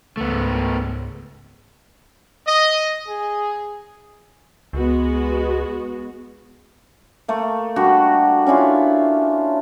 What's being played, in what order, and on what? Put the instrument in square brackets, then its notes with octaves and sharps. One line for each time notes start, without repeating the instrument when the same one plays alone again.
[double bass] C#2 G#2 [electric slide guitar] A3 B3
[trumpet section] D#5
G#4
[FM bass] C#2 [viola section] G#3 B3 F#4
[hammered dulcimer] A3 A#3
G3 D4 F#4
C#4 D4 E4 F4